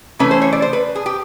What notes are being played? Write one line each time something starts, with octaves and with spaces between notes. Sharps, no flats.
C#3 E3 A3 C#4 B4
C5
C#5
D5
C5
B4
G#4
G4